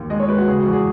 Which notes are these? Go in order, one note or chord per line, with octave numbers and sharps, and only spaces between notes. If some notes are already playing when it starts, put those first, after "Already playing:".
Already playing: D#2
G#3 D#5
C#5
G#3 B4
F#4
C#3 G#4
F#4
E2
G#4